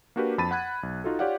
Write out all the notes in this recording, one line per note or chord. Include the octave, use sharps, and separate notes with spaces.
A#3 D4 F#4 G4 A#4 B4
F2 A5 B5 A6 D#7
F#5 B5 F#6 G#6
B1
D#4 F4 F#4 A4
F4 G4 C#5 D5 F5 F#5